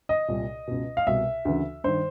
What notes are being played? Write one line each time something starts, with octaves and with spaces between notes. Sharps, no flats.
D#5
C2 A#2
C#2 B2
F5
C2 B2 E5
D2 C#3 E3
G2 D#3 C5